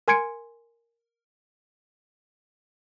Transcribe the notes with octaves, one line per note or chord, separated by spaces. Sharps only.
A#4 G#5 C6 G#6 C#7 D7